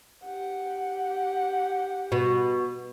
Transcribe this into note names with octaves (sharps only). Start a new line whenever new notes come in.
G4 F#5
B2